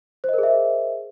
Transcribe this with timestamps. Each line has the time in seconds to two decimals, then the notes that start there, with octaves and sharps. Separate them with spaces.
0.24 C5
0.29 D#5
0.34 A#4
0.38 G#4
0.43 E5